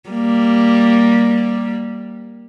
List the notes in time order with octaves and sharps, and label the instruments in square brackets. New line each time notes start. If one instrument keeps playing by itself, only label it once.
[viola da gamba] G3 A#3